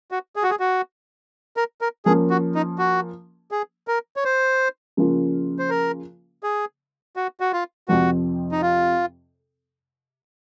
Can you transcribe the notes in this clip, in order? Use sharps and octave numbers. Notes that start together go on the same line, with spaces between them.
F#4
G#4
F#4
G#4
F#4
A#4
A#4
F3 A#3 C#4 G#4
F#4
D#4
F#4
G#4
A#4
C#5
C5
C#3 F3 A#3 C#4 F4
C5
A#4
G#4
F#4
F#4
F4
F2 C3 F3 C4 F#4
D#4
F4